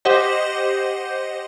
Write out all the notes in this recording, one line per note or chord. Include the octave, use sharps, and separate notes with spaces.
G4 C5 D#5 F#5